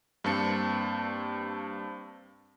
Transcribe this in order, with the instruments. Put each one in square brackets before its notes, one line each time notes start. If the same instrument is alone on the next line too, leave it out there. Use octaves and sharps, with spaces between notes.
[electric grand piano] G2 A#3 C4 A5 C#7